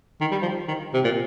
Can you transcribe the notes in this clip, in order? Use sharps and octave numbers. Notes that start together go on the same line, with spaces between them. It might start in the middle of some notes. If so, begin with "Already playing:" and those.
D#3
G3
F3
D#3
C3
A#2